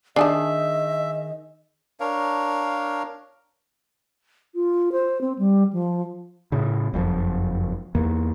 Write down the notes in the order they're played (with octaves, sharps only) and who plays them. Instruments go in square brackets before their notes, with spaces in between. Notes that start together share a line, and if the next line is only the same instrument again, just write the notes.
[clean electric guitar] D#3 G#4 [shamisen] D4 G#5 A5 [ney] D#5 [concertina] E5
[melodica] D4 A#4 C#5 F5
[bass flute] F4
C5
C4
G3
F3
[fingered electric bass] A2 C#3
F#1 F2 A#2 F3
E2 A#3